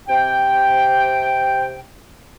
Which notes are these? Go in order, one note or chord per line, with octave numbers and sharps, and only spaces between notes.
C3 G5